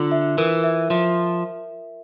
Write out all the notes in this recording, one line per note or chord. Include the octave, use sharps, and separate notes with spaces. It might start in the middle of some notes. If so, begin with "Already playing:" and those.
Already playing: D3 F4
E5
E3 A#4
E5
F3 E5